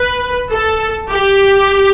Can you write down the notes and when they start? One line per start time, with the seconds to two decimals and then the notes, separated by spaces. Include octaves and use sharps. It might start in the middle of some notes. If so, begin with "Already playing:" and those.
Already playing: B4
0.51 A4
1.09 G4